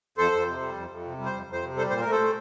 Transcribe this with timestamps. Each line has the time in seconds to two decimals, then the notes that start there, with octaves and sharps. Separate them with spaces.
0.18 F2 A4 C5
0.32 F2
0.47 C3
0.61 G3
0.75 F2
0.90 F2
1.05 C3
1.18 G3
1.26 C5
1.33 F2
1.47 F2
1.52 C5
1.62 C3
1.76 G3 A4 C5
1.90 A#2 C5
2.01 A3 A#4
2.11 A4 C5
2.20 A3